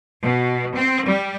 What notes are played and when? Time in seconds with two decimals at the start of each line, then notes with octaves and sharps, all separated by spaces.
0.22 B2
0.75 C4
1.07 G3